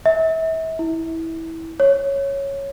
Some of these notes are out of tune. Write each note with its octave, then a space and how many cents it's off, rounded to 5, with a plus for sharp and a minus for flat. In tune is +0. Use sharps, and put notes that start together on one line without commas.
E5 -35
E4 -20
C#5 -5